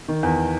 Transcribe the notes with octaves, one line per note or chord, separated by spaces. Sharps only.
D#3
E2